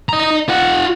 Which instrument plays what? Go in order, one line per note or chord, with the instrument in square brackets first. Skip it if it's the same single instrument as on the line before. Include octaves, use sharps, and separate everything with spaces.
[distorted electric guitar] D#5 A#5
F4 F#5